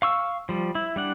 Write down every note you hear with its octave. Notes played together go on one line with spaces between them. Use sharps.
F5 C#6 E6
F3 G3
E4
G3 D4 F#5